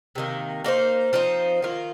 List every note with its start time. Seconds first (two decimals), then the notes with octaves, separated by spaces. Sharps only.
0.15 C3 D#3 A#3
0.64 A#3 D#4 F#4 C5
1.13 F3 C4 D#4
1.62 D#3 A#3 F4